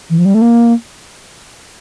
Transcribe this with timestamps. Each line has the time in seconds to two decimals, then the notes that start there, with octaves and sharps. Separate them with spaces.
0.10 E3
0.18 F3
0.25 G3
0.34 A3
0.41 A#3